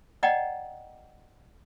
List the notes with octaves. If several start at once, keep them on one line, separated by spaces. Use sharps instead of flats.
D5 D#5 F#5 G5 A#5